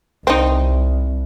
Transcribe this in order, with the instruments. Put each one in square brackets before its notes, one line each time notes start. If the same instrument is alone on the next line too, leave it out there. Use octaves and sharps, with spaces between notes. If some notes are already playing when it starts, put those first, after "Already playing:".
[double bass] C2 [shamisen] C4 D#4